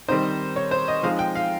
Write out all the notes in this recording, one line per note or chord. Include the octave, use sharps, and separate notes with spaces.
D#3 G3 C4 D#4 C5
C#5
C5
D#5
F3 G#3 C4 D#4 F5
G5
F5